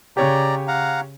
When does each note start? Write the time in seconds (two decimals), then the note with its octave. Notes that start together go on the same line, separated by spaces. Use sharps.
0.17 C#3 G4 C#5 D5 A#5
0.68 F5 F#5 A#5